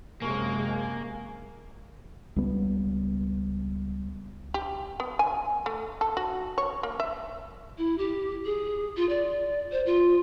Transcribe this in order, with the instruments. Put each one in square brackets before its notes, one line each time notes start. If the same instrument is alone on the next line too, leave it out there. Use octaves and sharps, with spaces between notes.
[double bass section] F#2 C3 [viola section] G#3 [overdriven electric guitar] A#3 [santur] C#4 C#6
[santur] G#5
[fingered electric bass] C#2 G3 B3
[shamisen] G4
B3
G#5
A3
A4
F#4
C#5
A#3
E5
[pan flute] E4
G4
G#4
F4
D5
C5
F4